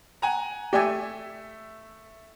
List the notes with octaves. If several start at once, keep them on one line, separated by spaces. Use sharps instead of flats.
F#5 G#5 A#5
A3 G4 D5 E5 G#5